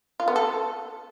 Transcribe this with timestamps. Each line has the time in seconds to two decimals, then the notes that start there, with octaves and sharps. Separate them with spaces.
0.20 F4
0.28 B3
0.36 A4